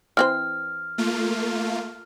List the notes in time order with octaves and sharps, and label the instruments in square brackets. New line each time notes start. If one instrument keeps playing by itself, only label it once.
[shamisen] E3 C4 C5 [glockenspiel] F6
[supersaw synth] A3 A#3 F4